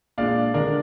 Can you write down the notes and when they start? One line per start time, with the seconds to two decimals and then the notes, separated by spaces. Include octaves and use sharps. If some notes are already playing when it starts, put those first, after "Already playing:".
0.18 A#2 G#3 D4 D5 F5
0.54 D3 G#3 D4 A#4 D5